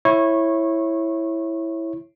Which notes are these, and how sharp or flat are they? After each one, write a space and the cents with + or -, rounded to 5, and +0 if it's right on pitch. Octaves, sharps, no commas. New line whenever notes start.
E4 +0 C#5 -20 C#6 -30